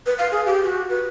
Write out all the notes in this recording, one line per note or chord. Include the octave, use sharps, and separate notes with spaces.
B4
F5
G#4
G4
F#4
B4